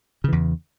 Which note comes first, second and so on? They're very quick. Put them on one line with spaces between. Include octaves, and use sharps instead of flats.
C#3 E3 E2